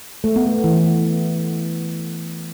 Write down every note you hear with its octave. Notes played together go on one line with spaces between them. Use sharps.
A3
B3
A3
E3